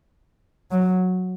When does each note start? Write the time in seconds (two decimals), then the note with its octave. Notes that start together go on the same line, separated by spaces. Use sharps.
0.71 F#3